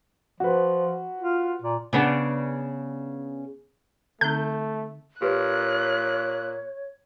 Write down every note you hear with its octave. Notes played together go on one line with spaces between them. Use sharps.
F3 F#4 B4
F4
A#2
C#3 B3 D4
D3 A3 C4 D#4 G6
A#2 G4 B4 C#5 F#6